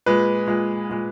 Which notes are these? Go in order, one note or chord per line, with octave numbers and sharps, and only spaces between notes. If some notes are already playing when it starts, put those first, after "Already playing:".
A#2 G#3 B4
A#2 G#3
A#2 G#3